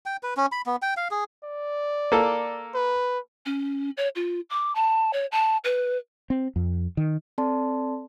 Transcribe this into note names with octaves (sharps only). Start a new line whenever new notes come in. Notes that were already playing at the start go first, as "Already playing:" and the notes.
G5
B4
C#4
B5
B3
G5
F5
G#4
D5
A#3 A4
B4
C#4
C#5
F4
D6
A5
C#5
A5
B4
C4
F2
D#3
C4 A4 D5 A5 C6